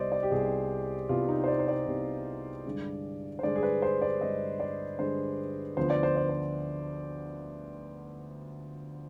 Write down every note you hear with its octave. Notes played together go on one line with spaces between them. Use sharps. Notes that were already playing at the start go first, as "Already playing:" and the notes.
Already playing: C2 C3 G3 B3 C5 D5 D#5
D5
G4
C2 C3 G3 B3 G#4
C2 C3 G3 B3 F4
D#4
C5
D5
C5
D5
C2 C3 G3 B3
G2 D3 G#3
C5
G2 D3 G#3 D5
G#4
B4
C5
D5
G2 D3 G#3 D#5
D5
G2 D3 G#3 C5
D2 D3 F3 B3 C5
D5
C5
D5
C5